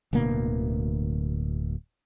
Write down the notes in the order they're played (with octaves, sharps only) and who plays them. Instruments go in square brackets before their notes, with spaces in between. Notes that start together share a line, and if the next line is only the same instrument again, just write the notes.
[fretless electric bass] D1 D2 B2 A#3